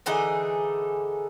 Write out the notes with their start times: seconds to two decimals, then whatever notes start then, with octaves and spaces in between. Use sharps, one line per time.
0.06 D3 E3 D#4 G#4